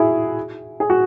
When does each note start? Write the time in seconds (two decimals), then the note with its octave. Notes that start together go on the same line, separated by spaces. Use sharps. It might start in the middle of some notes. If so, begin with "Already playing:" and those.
Already playing: E4 F#4 G#4
0.80 G#4
0.90 F#4